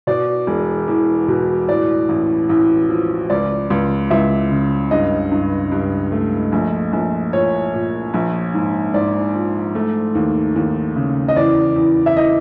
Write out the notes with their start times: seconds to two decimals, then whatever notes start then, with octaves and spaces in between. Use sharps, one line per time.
0.07 B2 D5
0.47 E1
0.88 E2
1.28 B2
1.68 A2 D5
2.09 A1
2.49 A1
2.89 F3
3.30 C#2 D5
3.70 C#2
4.11 C#2 E5
4.51 C#3
4.91 G2 D#5
5.31 G2
5.72 G2
6.12 A3
6.52 A#1
6.93 A#1
7.33 A#2 C#5
7.73 A#2
8.14 A#1
8.54 G#2
8.94 G#2 D5
9.34 F3
9.75 A3
10.15 D#2
10.56 D#2
10.96 C#3
11.28 D#5
11.36 E2 D5
11.76 E2
12.06 E5
12.16 E3 D#5